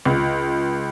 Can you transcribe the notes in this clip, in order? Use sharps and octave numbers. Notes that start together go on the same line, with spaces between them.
C#2